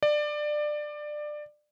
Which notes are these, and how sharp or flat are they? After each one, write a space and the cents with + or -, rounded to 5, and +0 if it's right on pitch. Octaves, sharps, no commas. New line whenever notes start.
D5 +20